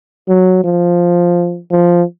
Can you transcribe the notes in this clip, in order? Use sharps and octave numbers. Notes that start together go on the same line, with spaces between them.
F#3
F3
F3